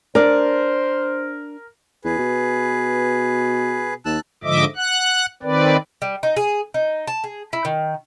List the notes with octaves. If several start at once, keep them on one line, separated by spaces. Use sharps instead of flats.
D4 A#4 C5 D5
E2 G#4 B4
B2
D#2 A5 E6 F#6
G#2 D3 F3 D#5 E5 D6
F#5 F#6
D#3 C4 B4 D5
G3
D#4
G#4
D#4
A5
G#4
E4
D#3